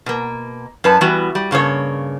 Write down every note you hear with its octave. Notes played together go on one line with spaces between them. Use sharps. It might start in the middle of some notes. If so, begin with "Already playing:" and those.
B2 A#3
F#2 B4 A5
E3 G3 B3 F#4
G3
G2 C#3 A#3 C#5